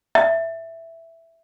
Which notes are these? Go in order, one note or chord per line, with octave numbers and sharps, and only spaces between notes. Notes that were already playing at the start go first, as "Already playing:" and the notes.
E5